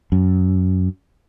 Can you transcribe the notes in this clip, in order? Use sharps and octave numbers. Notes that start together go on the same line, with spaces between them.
F#2